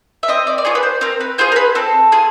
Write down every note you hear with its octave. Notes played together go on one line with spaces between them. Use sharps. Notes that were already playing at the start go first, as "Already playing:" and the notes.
E5
C4 D#5
D5
D5
F4 G#4 C#5
B4
C5
C4 A#4
B4
F4 G#4 C5
A#4
B4
C4 A4
F4 G#4